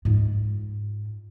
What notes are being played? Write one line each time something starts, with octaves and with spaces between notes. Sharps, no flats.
G#2 F4